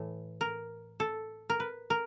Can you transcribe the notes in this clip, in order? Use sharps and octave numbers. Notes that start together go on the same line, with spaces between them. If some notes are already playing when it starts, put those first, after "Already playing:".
Already playing: A2 E3 A3
A#4
A4
A#4
B4
A#4